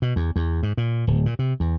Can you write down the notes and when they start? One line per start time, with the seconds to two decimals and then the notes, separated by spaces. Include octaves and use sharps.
0.02 B2
0.16 E2
0.36 E2
0.63 G#2
0.77 A#2
1.07 D1
1.26 A#2
1.39 C3
1.60 E2